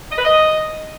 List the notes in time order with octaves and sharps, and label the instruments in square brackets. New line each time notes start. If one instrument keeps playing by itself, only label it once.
[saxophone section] D#5
B4
D#5